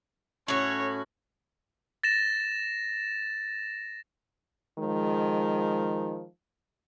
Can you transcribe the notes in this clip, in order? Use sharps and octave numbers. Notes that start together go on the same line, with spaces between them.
A2 C#4 F#4 C#5
A6 A#6 E7
D#3 F3 G#3